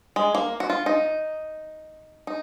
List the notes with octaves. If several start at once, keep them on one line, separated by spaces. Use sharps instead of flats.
G#3
A#3
F#4
F4
D#4
D#4